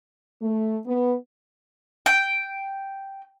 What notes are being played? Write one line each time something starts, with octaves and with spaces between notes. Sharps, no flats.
A3
B3
G5